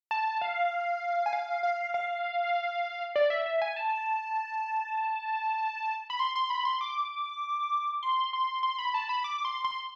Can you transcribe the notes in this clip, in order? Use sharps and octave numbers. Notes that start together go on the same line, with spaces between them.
A5
F5
G#5
F5
F5
F5
D5
E5
E5
G#5
A5
B5
C6
C6
B5
C6
D6
C6
C6
C6
B5
A5
B5
D6
C6
C6